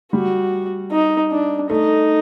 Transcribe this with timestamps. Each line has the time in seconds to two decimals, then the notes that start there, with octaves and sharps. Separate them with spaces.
0.13 G3 F#4
0.92 D#4
1.32 D4
1.70 A3 D#4